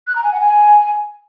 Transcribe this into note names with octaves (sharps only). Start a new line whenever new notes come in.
F#6
A#5
G#5
F#5
G#5